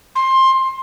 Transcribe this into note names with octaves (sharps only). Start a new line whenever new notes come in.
C6